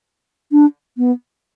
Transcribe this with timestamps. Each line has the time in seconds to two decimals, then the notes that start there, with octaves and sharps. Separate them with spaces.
0.52 D4
0.98 B3